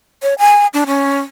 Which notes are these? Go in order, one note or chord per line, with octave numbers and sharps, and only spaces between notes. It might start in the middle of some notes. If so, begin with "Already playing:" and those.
C#5
G#5
D4
C#4